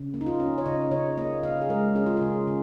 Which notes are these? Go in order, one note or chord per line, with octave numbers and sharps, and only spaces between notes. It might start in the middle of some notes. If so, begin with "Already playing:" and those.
Already playing: C#3
A#3
D#4
F4
C#4
C#5
C#3 D#5
C#3 C#5
A#3 D#5
C#3 F5
G#4
G#3 A#4
C#4 G#4
F4
C#3 G#4
C#3